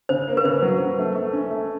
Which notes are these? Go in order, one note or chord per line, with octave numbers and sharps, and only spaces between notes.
C#3 C5
A#3
B4
C#3 C5
F#3
F#3
A3
A3
C#4
A3